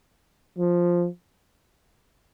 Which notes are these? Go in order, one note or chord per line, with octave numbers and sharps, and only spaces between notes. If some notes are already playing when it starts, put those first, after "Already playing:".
F3